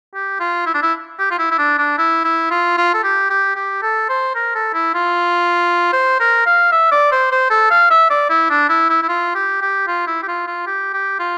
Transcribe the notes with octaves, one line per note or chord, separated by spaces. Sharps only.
G4
F4
E4
D4
E4
G4
F4
E4
E4
D4
D4
E4
E4
F4
F4
A4
G4
G4
G4
A4
C5
A#4
A4
E4
F4
C5
A#4
F5
E5
D5
C5
C5
A4
F5
E5
D5
E4
D4
E4
E4
E4
F4
G4
G4
F4
E4
G4
F4
F4
G4
G4
F4